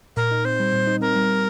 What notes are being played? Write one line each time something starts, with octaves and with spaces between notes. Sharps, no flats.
A#2 A#4
D#4
C4 C5
G3
A#2
D#4
C4 A#4
G3